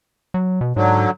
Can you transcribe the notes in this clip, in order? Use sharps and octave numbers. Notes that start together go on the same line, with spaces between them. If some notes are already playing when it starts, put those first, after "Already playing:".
F#3
B2
G#2 D3 F#3